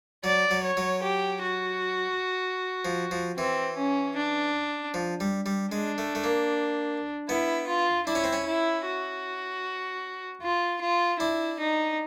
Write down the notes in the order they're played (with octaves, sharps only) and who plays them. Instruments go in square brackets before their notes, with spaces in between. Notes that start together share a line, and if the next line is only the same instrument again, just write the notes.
[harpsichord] F#3 [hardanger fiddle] D5
[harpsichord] F#3
[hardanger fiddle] C#5
[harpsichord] F#3
[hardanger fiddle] G4
F#4
[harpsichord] F3
F3
[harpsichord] E3 [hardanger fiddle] C4
[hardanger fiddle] C#4
D4
[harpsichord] F3
G3
G3
[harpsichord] G#3 [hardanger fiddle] D4
[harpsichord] A3
A3
A#3
[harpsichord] B3 [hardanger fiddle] E4
[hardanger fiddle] F4
[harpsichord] D4 [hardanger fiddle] E4
[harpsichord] C#4
C4
C#4
[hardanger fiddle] E4
F#4
F4
F4
[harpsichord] D4 [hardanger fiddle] E4
[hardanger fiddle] D#4